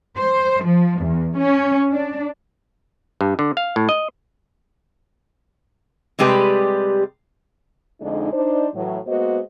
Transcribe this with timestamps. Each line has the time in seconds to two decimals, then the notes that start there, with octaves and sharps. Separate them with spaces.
0.17 C5
0.64 F3
1.02 E2
1.37 C#4
1.91 D4
3.21 G2
3.39 D3
3.57 F5
3.76 A2
3.89 D#5
6.19 C3 G3 G#3 G4 B4
8.01 F2 D3 G#3 D4 D#4
8.33 D4 D#4 C5
8.75 A2 E3 F#3
9.07 G#3 A#3 B3 F#4 C5 D#5